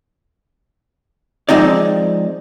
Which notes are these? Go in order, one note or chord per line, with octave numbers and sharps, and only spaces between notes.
F3 G#3 C4 D#4 D5